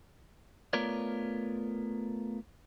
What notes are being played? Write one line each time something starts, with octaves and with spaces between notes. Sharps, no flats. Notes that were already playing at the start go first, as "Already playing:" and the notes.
A3 B3 F4 A#4 C#5 D5